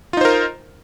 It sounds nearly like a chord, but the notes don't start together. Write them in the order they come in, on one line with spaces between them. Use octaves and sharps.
F4 D#4 C5 A#4